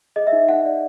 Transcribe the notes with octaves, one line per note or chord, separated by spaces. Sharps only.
G#4 D#5
E5
D#4
D#4 F#5
D5